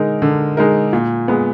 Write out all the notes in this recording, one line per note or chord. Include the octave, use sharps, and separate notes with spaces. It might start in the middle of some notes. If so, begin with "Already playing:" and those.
Already playing: D3 G#3 D#4 A#4
D3
G#3 D#4 A#4
A#2
G#3 B3